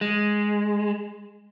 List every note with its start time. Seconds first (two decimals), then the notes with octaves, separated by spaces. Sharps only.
0.01 G#3